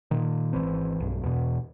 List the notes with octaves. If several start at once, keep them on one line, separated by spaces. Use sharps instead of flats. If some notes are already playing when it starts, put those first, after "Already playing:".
A#2 D#3
G#1 E3 C4
B1 G2
E2 B2